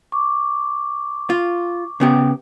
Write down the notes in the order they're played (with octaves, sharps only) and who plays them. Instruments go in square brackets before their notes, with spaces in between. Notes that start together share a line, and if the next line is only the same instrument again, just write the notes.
[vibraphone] C#6 D6
[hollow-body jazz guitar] F4
C#3 B3 G4